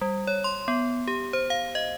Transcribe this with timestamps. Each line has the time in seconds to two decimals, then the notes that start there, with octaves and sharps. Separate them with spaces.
0.01 G3
0.27 C#5
0.44 C6
0.68 B3
1.08 G4
1.33 C5
1.50 F5
1.75 D#5